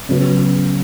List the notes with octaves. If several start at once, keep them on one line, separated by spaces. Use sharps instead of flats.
C#3 F#3 B3